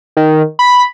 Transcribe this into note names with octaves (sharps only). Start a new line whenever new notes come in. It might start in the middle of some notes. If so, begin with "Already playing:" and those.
D#3
B5